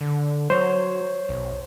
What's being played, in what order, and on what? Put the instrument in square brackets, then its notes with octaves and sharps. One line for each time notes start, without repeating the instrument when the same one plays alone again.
[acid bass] D3
[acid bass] F#3 [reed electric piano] C5 C#5
[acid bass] B1